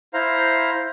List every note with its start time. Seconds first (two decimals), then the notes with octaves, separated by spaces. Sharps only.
0.14 E4 C5 F5 A#5